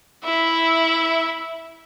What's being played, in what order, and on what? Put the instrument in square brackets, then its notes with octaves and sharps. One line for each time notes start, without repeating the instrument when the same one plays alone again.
[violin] E4 E5